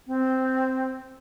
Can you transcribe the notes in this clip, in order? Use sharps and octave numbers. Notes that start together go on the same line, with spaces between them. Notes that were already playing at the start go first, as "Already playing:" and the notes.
C4